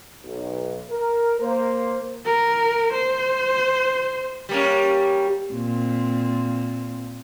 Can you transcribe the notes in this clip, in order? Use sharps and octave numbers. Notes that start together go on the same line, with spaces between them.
B1
A#4
A#3 C5
A#4
C5
G3 A#3 C#4
A#2 C4